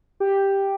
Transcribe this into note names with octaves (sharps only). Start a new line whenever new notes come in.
G4